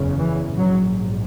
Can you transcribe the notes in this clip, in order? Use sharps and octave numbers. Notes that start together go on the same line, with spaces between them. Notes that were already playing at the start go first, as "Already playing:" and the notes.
Already playing: F#1 E2 C#3
E3
A#1 G#2 F#3